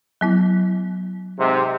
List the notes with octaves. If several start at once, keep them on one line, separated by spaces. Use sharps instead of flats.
F#3 B3 E4
G#2 C3